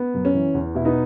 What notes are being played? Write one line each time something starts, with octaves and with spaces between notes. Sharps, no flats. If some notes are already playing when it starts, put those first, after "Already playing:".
Already playing: B3
F#2
C#4
E3
E2
B2 E4
B3 D#4